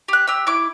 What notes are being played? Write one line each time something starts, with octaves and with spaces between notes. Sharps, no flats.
G4 F#6
G4 E6
E4 D6